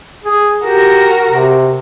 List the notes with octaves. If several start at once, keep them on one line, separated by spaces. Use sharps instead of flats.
G#4
F#4 G4 A#4
C3